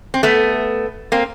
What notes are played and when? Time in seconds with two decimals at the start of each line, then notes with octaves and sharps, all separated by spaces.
0.14 C4
0.23 A3 B3
1.12 A#3 C4